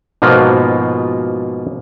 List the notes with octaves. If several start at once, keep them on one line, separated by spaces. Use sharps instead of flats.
G#2 B2 F3 A#3 F4